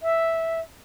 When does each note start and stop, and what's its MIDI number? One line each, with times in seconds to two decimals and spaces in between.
0.01 0.60 76